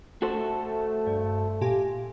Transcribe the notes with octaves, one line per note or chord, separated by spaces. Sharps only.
A3 F#4 A4 C5
G2
A#2 G4 G#5